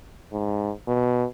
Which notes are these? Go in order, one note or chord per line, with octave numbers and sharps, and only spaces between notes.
G#2
B2